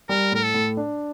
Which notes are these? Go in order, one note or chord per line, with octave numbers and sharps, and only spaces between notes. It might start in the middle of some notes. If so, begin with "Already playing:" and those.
G3 A#4
A2 A#4
A4
A2
D4